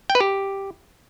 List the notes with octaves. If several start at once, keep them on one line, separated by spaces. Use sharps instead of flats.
G5
B4
G4